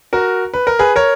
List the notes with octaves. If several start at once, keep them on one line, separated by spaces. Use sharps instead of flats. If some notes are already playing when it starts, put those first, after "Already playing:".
F#4 A#4
B4
A#4
G#4 B4
A#4 C#5